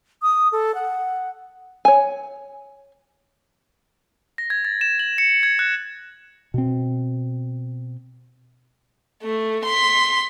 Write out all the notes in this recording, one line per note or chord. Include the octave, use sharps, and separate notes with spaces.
D#6
A4
F#5
C#5 G#5
A#6
G#6
A6
E7
F#7
C#7
G#6
F#6
B2 C4
A3
C6 B6